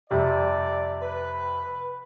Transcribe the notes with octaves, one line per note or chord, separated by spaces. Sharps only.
F2 C3 G3 D5
B4